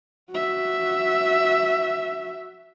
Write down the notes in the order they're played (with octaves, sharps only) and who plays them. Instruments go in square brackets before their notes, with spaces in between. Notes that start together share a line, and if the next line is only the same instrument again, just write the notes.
[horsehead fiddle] F#4 E5